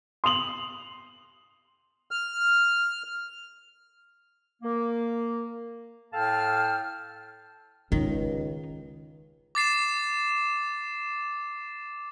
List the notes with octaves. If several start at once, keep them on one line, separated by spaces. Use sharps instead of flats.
C6 D#6 F7 F#7
F6
A#3
A2 A4 F5 G5 A5 F6
C#2 D#3 D#4
D6 A6 C7 E7